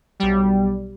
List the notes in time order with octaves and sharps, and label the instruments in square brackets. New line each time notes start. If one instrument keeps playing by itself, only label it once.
[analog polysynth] B1 G3